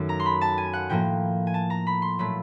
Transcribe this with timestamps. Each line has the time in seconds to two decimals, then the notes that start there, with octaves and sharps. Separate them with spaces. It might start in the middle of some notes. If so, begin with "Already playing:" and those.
Already playing: F#2 D#3 F#3 A3
0.09 A#5
0.20 C6
0.26 B5
0.41 A5
0.58 G#5
0.73 F#5
0.89 A2 F3 A#3 G5
1.47 G#5
1.54 A5
1.70 A#5
1.87 B5
2.02 C6
2.19 A#2 F#3 A3 B5